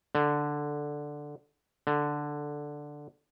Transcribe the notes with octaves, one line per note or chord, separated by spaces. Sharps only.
D3
D3